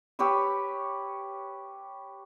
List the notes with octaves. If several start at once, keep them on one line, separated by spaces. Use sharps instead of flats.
G4 B4 C#5 E6